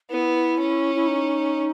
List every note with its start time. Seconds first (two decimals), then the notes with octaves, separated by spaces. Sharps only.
0.10 B3 E4
0.59 C#4
0.96 E4
1.07 D#4